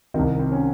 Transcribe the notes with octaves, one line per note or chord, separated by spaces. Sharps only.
C2 C3 D#3 C4
C4
C#4